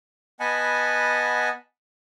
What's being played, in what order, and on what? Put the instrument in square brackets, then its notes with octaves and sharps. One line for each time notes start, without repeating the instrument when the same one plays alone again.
[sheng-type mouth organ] B3 D#5 F#5 G#5 A5 B5